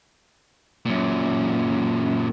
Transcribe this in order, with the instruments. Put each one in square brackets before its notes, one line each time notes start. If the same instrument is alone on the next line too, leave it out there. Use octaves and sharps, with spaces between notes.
[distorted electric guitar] F#2 A#2